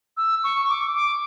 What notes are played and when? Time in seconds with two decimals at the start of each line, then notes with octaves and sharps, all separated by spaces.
0.17 E6
0.44 C#6
0.69 D6
0.94 D6